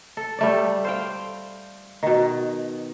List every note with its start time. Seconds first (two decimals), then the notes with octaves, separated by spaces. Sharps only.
0.17 A4
0.39 G3 A3 D5
0.85 C5 F5 G5
2.03 B2 D#3